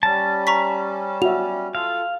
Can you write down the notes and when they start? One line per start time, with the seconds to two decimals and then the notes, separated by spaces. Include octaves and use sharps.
0.03 G3 C#4 A5
0.47 A#5 C#6 B6
1.22 F#4 E5 F7
1.75 F4 A4 F5